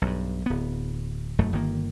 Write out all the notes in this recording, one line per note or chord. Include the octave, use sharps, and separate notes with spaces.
B1 G2
D1 B3
D#1 F#2 A3
G1 D#3 A#3